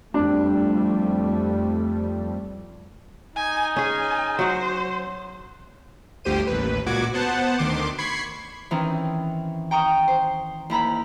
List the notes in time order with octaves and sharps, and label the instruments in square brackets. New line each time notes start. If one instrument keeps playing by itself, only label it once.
[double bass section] F2 G3 A3 [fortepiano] D4
[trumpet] D#4 [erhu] G#5
[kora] C#4 G#4 [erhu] G#5
[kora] F#3 F#4 [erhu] C5
[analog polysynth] G1 D2 G4 C5 D#7
A1 D#2 B4
C#2 A#2 F#4 D6 G#6
B3 C5 F#5 A5
D2 D#3 C6 D6
B5 C#6 G#6 C7
[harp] D#3 E3 C4 C#4 D#4
G5 A#5 C#6 D#6
C5
D#2 E4 A#5 B5